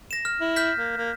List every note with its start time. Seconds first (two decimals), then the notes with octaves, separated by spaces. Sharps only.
0.11 A#6 E7
0.25 F6
0.41 E4
0.56 F6 G6 B6
0.77 A#3
0.97 A#3